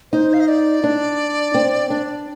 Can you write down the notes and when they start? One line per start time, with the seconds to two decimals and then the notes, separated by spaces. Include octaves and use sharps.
0.12 D#4 C5
0.34 F5
0.40 D#5
0.48 D5
0.84 D4
1.54 C4
1.90 D4